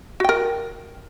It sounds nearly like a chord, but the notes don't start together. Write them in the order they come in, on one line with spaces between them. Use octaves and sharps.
F#4 G5 A#4